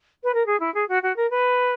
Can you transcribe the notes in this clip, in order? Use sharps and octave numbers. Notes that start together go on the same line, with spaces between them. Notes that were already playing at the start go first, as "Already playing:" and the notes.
B4
A#4
G#4
E4
G#4
F#4
F#4
A#4
B4